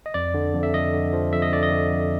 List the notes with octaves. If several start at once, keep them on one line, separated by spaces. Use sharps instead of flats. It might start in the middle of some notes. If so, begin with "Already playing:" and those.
D#5
F2 D5
D3
F2
E5
F3 D#5
D3
F3
F2 E5
D#5
D3 D5
D#5
D3
F2